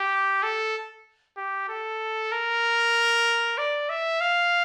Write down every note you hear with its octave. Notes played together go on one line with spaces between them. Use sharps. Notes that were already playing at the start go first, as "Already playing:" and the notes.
Already playing: G4
A4
G4
A4
A#4
D5
E5
F5